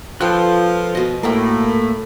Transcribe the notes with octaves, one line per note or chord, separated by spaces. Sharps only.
F3 F4 A4 B4 G5 F#6
B2 D#5
A2 A3 A#3 A#4 F#5 G5